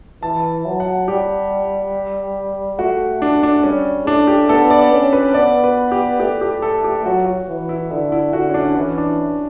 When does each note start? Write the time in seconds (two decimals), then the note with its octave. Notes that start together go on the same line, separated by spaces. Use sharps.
0.23 E3 A5
0.65 F#3
0.80 F#5
1.07 G3 G4
2.79 A3 F#4
3.21 A3 D4
3.43 D4
3.63 G3 C#4
4.06 A3 D4
4.27 G4
4.49 B3 A4
4.70 D5
4.93 C#4
5.13 B4
5.34 B3 D5
5.64 B4
5.91 G4
6.20 A3 G4
6.41 G4
6.62 A4
6.84 G4
7.05 F#3 F#4
7.26 F#4
7.48 E3
7.69 E4
7.91 D3 E4
8.12 E4
8.33 D3 F#4
8.49 C#4
8.54 D4
8.76 E3 C#4
8.98 D4